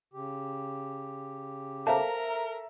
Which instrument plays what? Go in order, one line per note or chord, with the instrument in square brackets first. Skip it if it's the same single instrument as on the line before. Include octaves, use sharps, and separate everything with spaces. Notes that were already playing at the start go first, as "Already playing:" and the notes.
[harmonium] C#3 G4
[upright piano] A4 E5 A#5 [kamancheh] A#4 [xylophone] C5 F5 A5